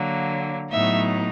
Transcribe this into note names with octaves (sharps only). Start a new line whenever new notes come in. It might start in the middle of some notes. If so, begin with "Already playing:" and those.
Already playing: D3 F#3 A#3
A2 F#3 B3 D#4 E5